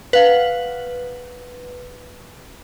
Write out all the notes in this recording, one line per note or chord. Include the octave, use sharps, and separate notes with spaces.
B4 F5 F#5